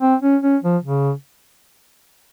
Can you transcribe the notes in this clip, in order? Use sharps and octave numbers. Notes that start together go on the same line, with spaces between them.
C4
C#4
C#4
F3
C#3